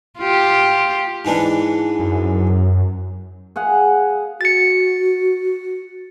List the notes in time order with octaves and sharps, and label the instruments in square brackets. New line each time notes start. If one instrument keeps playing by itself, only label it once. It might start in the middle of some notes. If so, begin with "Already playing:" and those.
[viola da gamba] F4 G4
[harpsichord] G#2 E3 D4
[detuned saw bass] F#2
[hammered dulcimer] G#4 F5 F#5
[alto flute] F#4 [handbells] A6 C#7